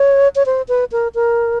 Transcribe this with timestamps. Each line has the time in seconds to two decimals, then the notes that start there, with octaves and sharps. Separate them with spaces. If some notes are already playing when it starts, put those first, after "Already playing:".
Already playing: C#5
0.35 C#5
0.46 C5
0.68 B4
0.92 A#4
1.15 A#4